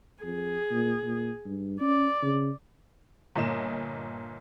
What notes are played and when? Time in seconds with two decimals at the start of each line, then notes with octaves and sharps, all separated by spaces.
0.24 F2 G#4
0.71 A#2
1.03 A#2
1.46 G2
1.81 C#4 D5
2.22 C#3
3.35 G1 A#2 D#5 E7